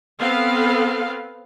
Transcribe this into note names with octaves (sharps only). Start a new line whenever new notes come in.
B3 C4 A4 F5